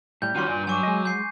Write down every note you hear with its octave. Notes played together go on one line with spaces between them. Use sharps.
A2 G3 G6
D#3 G3 C#4 F4 F#4 C6 D#7
G2 F4 D5
F#3 G#5 C#6 D6
G#3 D#5
G#3 G6 C7